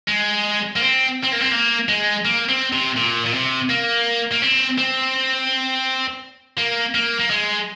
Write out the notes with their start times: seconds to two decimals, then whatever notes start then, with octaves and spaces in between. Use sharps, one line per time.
0.08 G#3
0.76 A#3
0.81 C4
1.24 C4
1.32 A#3
1.41 C4
1.52 A#3
1.88 G#3
2.25 A#3
2.49 C4
2.73 C3
2.97 A#2
3.26 A#2
3.34 C3
3.69 A#3
4.32 A#3
4.42 C4
4.78 C4
6.58 A#3
6.94 A#3
7.20 A#3
7.30 G#3